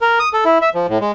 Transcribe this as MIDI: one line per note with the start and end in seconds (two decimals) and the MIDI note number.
0.02 0.19 70
0.20 0.29 87
0.33 0.44 69
0.45 0.58 64
0.62 0.69 76
0.75 0.87 53
0.89 0.98 45
1.01 1.12 56